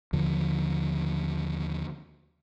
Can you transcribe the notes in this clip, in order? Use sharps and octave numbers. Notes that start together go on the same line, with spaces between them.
D#2 D3 F3